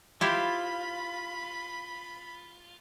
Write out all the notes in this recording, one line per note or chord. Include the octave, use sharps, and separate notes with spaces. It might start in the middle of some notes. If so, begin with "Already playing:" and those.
E4 F4 G4 C5 B5